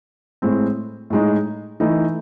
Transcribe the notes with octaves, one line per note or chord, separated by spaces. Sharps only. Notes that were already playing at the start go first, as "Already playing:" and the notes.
A2 G#3 C4
A2 G#3 D#4
E3 A3 D#4